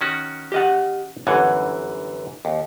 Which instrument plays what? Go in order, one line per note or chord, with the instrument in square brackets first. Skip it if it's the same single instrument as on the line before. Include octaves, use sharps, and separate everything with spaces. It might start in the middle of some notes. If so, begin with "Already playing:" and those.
[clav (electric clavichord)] D#3 C#4 F#4
[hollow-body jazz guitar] G4 D#5 F#5
[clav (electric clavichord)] G1 F#2 E3 [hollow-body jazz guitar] C#5 F#5
[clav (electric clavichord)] D#2